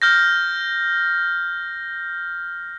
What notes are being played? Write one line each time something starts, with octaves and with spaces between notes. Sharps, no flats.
F6 G6 A#6